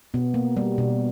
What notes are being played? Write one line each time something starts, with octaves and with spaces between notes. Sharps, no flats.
B2 B3
A#3
G3
B2